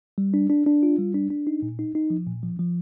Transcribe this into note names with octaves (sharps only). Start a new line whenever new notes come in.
G3
D4
D4
D4
F4
G3
D4
D4
D#4
A#2
D#4
D#4
F3
A#2
F3
F3